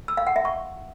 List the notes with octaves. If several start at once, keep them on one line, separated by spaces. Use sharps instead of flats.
E6
F5
F#5
E5
C#6